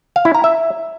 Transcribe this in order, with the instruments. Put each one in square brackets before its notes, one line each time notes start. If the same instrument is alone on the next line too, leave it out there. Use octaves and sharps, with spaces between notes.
[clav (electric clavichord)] F5
E4
A#5
E5